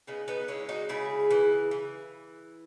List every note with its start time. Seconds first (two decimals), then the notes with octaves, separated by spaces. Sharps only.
0.07 C#3 B3 D#4
0.28 B3 D#4
0.48 G#3 C#4 E4
0.69 D#4 F#4
0.89 C#3 E4 G#4
1.31 E3
1.71 E3